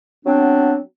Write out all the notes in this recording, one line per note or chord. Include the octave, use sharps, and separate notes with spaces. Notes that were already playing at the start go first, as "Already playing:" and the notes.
F#3 B3 C4 D4